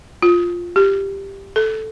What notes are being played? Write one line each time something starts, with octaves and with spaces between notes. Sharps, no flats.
F4
G4
A4